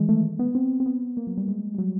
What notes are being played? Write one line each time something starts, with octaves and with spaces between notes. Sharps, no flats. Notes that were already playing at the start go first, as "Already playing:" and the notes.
Already playing: D#3 E3 G#3
A3
B3
C4
C4
B3
A#3
F#3
G3
G#3
G3
F#3